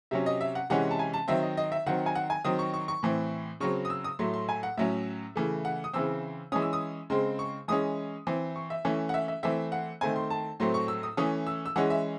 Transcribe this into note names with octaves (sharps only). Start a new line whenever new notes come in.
C3 F#3 C#4 E5
D#5
E5
F#5
C3 E3 G#3 C#4 F#5
A5
G#5
A5
D#3 F#3 C4 E5
D#5
D#5
E5
D#3 F#3 C4 F#5
G#5
F#5
G#5
D#3 F#3 C4 D#6
C#6
C#6
C#6
A2 E3 C4
C#3 F#3 C4 C#6
D#6
E6
D#6
A2 F#3 A3 C6
C6
G#5
F#5
A2 F#3 C#4 E5
C#3 E3 A3
F#5
D#6
C#3 E3 C4 E6
E3 G#3 C#4 D#6
E6
D#6
C#3 G#3 C4 C6
C#6
E3 G#3 C#4 D#6
E3 C4
C#6
E5
E3 A3 C#4
F#5
E5
E5
E3 A3 C4 E5
F#5
D#3 A3 C4 G#5
C6
A5
A2 F#3 A3 C4 C6
C#6
E6
D#6
E3 A3 C#4 D#6
E6
E6
E3 G#3 C#4 F#5
E5